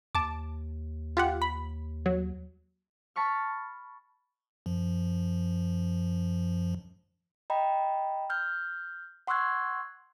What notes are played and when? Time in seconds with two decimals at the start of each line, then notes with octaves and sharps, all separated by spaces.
0.15 D#2 A5 D6
1.17 F4 G4 F#5
1.42 B5
2.06 F#3
3.16 A5 B5 C#6 F6
4.66 F#2 F3
7.50 D#5 G5 A#5 B5
8.30 F6 G6
9.27 F#5 C6 C#6 E6 F#6 G#6